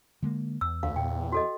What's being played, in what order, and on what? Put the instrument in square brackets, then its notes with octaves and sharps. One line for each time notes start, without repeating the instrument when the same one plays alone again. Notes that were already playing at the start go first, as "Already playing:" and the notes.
[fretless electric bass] D3 G#3 A#3
[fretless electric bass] E2 [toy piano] E6
[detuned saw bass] D2 [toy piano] F5
[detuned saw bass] E2 [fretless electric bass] A#2 [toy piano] G5
[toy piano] F#4 A4 D#5